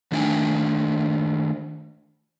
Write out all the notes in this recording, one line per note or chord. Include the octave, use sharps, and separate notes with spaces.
D#3 A3 D4 E5 G5 G#5